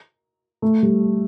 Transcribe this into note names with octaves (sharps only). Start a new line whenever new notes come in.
A3
G3